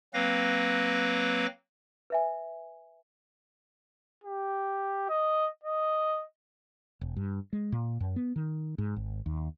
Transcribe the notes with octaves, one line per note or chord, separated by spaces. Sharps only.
F#3 A#3 C4 B4 F5 A#6
B4 E5 G#5
G4
D#5
D#5
E1
G2
G#3
A#2
F#2
B3
D#3
G#2
G#1
D#2